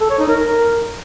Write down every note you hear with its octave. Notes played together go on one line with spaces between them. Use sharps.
A4
C#5
D#4
A#4